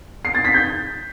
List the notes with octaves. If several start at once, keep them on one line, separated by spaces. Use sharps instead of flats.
C7
A6
B6
G6